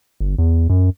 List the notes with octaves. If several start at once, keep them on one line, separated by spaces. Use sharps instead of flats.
G1
E2
F#2